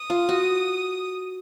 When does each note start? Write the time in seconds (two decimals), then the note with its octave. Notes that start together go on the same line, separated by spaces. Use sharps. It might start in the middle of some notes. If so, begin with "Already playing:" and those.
Already playing: D#6
0.10 F4
0.29 F#4